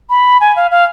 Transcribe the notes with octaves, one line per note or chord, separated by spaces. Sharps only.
B5
G#5
F5
F5